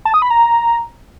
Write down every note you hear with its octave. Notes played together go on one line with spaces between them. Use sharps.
A5
D#6
B5
A#5